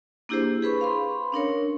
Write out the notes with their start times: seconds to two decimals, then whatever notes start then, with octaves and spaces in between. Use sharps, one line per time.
0.29 A#3 D4 E4 G4 G#4 C5
0.62 G#4 B4 B5 C#6
0.81 F5 B5 C6
1.32 C#4 D4 A#4 C#5